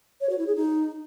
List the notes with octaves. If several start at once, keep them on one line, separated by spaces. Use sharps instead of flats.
C#5
F#4
E4
G#4
D#4